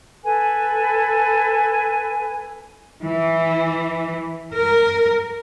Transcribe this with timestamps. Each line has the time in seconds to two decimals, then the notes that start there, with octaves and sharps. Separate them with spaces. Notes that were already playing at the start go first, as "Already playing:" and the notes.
0.23 A4 B4 G#5
3.03 E3
4.53 A#4